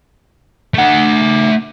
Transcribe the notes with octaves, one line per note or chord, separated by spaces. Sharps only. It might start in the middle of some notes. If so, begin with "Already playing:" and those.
A3 F#5